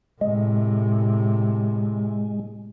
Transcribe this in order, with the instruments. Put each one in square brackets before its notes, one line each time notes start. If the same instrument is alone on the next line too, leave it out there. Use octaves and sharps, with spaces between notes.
[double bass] A2 C3 [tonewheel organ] G#3